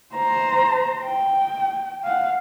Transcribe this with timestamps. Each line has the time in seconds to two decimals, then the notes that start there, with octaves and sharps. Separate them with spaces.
0.15 C5 A#5
1.03 G5
2.04 F5 F#5